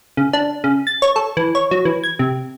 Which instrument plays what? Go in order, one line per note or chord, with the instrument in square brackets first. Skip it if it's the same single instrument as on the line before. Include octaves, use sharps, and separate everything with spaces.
[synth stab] C#3
D4
C#3
A6
C#5
A4
E3
C#5
F#3
E3
G#6
C3